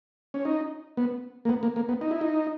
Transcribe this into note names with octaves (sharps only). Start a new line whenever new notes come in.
C#4
D#4
B3
A#3
B3
A#3
A#3
B3
D#4
E4
D#4